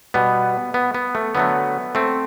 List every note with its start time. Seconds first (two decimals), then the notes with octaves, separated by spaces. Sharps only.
0.14 B2 G3 B3
0.74 B3
0.94 B3
1.15 A3
1.35 D3 F#3 A3 B3
1.95 A3 C4